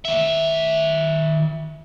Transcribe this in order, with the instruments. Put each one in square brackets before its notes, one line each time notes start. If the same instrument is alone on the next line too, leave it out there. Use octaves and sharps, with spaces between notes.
[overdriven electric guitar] D#3 E5